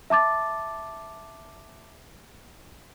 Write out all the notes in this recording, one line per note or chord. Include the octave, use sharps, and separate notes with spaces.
E5 A5 D6 A6